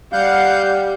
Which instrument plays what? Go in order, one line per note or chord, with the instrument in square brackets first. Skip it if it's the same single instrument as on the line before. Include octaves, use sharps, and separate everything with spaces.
[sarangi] G3 [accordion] F5 F#5 G6